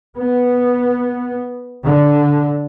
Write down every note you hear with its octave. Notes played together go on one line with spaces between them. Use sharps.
B3
D3